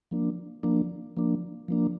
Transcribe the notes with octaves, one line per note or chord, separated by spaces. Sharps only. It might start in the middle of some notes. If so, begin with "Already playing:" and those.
F3 A#3 D4
F3 A#3 D4
F3 A#3 D4
F3 A#3 D4